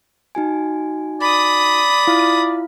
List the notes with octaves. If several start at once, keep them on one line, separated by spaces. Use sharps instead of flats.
D#4 F#4 G#5
D5 B5 D#6
E4 F4 F5